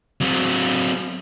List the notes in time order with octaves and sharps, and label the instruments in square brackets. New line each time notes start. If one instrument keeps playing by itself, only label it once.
[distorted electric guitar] F#3 C4